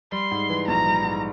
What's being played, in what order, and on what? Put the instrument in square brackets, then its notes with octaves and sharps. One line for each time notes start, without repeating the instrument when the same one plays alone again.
[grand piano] G3 [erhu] C6
[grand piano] G#2
E3
[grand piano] A#1 [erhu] A#5
[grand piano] G3
G#2